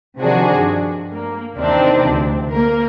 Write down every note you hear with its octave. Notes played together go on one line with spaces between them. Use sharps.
C3 D#3 F3 D4 F#4 G#4
G2
A#3
D#2 C3 E3 C4 D4 D#4
D2
A#3 A#4